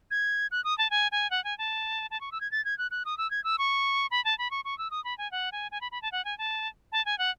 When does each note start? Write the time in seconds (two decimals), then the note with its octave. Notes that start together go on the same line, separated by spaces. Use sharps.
0.11 G#6
0.51 F#6
0.64 D#6
0.78 A5
0.91 G#5
1.12 G#5
1.31 F#5
1.44 G#5
1.58 A5
2.11 A5
2.21 C#6
2.32 E6
2.41 G#6
2.52 A6
2.65 G#6
2.78 F#6
2.91 F#6
3.05 D#6
3.18 E6
3.31 G#6
3.44 E6
3.58 C#6
4.11 B5
4.25 A5
4.39 B5
4.51 C#6
4.65 C#6
4.78 E6
4.91 D#6
5.04 B5
5.18 G#5
5.32 F#5
5.52 G#5
5.72 G#5
5.81 B5
5.92 B5
6.02 A5
6.12 F#5
6.25 G#5
6.38 A5
6.92 A5
7.05 G#5
7.18 F#5